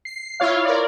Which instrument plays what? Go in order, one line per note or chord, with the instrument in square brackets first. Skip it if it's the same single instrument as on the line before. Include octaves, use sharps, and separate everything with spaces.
[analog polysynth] C7
E4 F4 C#5 F5
A#4 D5